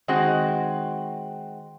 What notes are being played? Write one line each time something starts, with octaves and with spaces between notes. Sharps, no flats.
D#3 G#3 C4 F#4